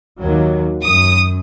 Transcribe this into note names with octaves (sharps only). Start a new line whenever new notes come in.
D#2 F#3
F#2 D#6